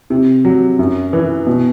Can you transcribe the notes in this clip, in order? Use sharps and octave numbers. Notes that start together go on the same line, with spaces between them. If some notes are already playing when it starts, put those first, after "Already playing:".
C3
F#3
F#2
E3
B2